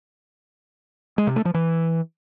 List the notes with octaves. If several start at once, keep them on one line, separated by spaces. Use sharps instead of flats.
G#3
C3
A3
F3
E3